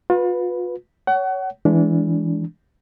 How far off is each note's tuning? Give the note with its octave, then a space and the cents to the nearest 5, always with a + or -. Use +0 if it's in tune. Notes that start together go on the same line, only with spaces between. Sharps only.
F4 +40 B4 -5
C#5 +15 F#5 +30
E3 +0 G#3 +0 D4 -25